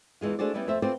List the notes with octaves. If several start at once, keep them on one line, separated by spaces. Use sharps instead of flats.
E2 E3 G#3 F4
A3 D4 F#4 G#4 C5 D5
G3 B3 C#4 E4 B4 D5
F2 A3 C5 E5
A3 C4 F4 B4 C5 D5